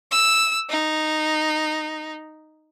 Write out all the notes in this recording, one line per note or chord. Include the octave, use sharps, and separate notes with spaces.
E6
D#4